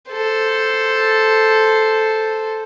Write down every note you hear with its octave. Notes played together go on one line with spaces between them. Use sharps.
A4 C5